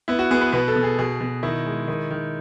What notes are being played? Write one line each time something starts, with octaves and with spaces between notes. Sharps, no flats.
B3 E4
F#4
B3 G#4
B4
B2 B4
A4
B2
G#4
B2 G#4
B2
D#3 E4
G#3
D#3
D#3